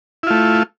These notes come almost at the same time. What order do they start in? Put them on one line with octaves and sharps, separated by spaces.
E4 F4 A3